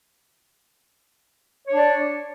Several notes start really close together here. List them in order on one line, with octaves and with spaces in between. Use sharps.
C#5 D4 D5